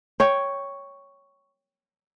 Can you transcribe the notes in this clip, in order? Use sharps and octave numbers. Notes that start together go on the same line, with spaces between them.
C#5 G5